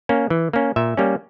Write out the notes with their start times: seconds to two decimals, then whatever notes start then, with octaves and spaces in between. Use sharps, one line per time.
0.09 A#3 C#4
0.30 E3
0.53 A#3 C#4
0.76 A#2 E5
0.97 G3 A#3 C#4